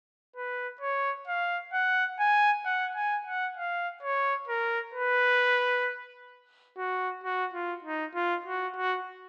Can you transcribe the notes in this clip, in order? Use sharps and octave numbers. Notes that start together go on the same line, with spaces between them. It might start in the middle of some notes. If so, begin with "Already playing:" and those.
B4
C#5
F5
F#5
G#5
F#5
G#5
F#5
F5
C#5
A#4
B4
F#4
F#4
F4
D#4
F4
F#4
F#4